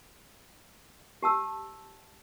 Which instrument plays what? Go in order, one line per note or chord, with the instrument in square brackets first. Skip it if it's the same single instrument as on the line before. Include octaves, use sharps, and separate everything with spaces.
[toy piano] G4 A5 E6